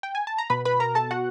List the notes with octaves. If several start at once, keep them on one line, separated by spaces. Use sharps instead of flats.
G5
G#5
A5
A#5
B2 B4 B5
B4 B5
A#4 A#5
A4 A5
F#4 F#5